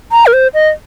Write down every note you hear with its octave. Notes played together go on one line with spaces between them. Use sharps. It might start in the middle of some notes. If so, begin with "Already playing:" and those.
A#5
A#4
C5
D#5